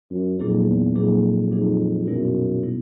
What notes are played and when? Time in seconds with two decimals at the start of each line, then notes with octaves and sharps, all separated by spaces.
0.11 F#2
0.39 F2 A#2 F#3 A#3 D#4 G#4
0.67 E2
0.95 F2 A#2 F#3 A#3 D#4 G#4
1.51 F2 A#2 F#3 A#3 D#4 G#4
2.07 F#2 B2 G3 B3 E4
2.63 B2 G3 B3 E4